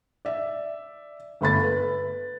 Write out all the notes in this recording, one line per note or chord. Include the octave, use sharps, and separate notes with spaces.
D5 E5
G1 A3 B5 A6
B4